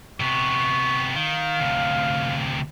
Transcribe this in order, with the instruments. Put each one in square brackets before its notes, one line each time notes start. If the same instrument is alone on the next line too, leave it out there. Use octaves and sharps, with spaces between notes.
[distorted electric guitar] C3 B3 [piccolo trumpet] C#6
[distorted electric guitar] D#3 [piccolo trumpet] F5
[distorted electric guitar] D2 C3